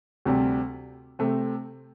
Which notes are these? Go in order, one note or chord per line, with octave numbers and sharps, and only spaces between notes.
D2 C3 G3
C3 A3 C4